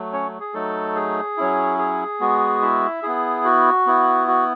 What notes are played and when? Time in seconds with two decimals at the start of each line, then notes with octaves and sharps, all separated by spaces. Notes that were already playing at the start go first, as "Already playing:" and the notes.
Already playing: F#3 A3
0.12 C#4 C#5
0.40 G#4
0.54 F#3 A3 D#4 A4
0.95 G#4
1.37 F#3 C#4 E4
1.78 G#4
2.20 G#3 B3 F#4
2.62 E4 E5
3.03 B3 E4 G#4
3.45 F#4
3.87 B3 E4
4.28 F#4